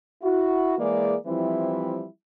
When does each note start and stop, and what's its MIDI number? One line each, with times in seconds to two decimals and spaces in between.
0.22 0.78 64
0.22 0.78 66
0.78 1.15 52
0.78 1.15 56
0.78 1.15 58
0.78 1.15 68
0.78 1.15 74
1.27 2.06 52
1.27 2.06 53
1.27 2.06 55
1.27 2.06 60
1.27 2.06 64